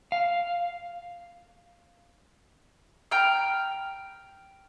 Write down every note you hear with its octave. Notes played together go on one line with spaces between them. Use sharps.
F5
G5 A#5 F6